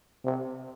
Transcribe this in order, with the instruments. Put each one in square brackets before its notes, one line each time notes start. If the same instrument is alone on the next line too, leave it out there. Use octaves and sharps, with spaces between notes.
[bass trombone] C3